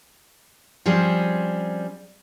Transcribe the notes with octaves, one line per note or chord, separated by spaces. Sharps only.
F3 G3 C4 C#4 G#4